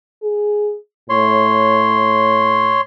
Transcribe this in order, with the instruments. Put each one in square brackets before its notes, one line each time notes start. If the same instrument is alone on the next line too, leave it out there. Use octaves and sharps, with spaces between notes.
[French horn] G#4
[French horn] A2 [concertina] C#5 C6